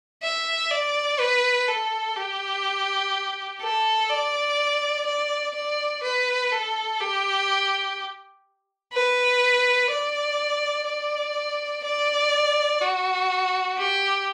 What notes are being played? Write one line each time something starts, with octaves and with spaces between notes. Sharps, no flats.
E5
D5
B4
A4
G4
A4
D5
D5
D5
B4
A4
G4
B4
D5
D5
D5
F#4
G4